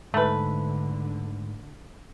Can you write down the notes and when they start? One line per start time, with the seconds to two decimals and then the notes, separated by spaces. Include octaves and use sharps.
0.14 G#2 D3 A3 B4